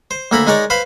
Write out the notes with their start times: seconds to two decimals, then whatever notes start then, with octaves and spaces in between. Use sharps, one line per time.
0.11 C5
0.31 D2 A#3 A4 A#4 B5
0.47 G#3 D#4 A#4 C#5 D5
0.70 B4 C5 F5 B5